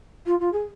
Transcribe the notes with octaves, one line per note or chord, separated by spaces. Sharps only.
F4
F4
G#4